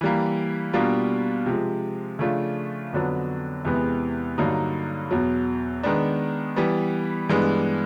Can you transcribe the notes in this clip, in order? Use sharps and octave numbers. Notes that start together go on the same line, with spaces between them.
E3 G3 A#3
B2 G3 A#3 D4 F4
C3 F3 G#3
C#3 F3 A3 D4 F4
F2 D3 F#3 B3
E2 C3 E3 G#3 B3
G2 D3 F#3 A#3 D#4
E2 B2 F#3
D#3 G#3 B3 D4
E3 G3 B3
G2 E3 G#3 B3 D4